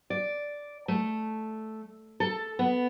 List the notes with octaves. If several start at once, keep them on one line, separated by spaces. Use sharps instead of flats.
D5
A3
A4
B3